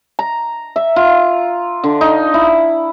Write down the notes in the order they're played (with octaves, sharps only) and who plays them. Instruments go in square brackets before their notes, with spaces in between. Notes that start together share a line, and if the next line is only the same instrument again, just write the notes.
[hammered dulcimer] A#5
E5
F4
D3
D#4
E4